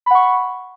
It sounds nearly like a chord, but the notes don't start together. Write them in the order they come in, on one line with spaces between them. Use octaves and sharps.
B5 F#5 C#6